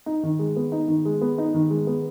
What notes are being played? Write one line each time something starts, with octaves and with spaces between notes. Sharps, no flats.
D#4
D#3
G#3
B3
D#4
D#3
G#3
B3
D#4
D#3
G#3
B3